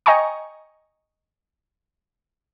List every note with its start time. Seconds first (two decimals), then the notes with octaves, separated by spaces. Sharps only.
0.06 D#5 G5 G#5 A#5 C#6